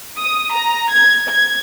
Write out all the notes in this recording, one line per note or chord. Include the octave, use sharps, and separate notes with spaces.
D#6
A#5
G#6
G#6